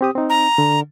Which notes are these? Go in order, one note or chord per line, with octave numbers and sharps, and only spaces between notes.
C4 G4 D#6
C4 D#4
A#5
D3